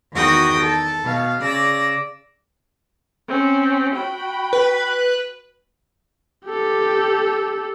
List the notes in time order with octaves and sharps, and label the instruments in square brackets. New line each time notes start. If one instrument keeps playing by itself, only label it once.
[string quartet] E2 D#3 F#4 G5 D#6 A#6
A4
B2 F5
C#3 D5 E6 A#6
C4 C#4
F#4 G5 B5
[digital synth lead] B4
[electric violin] G4 A4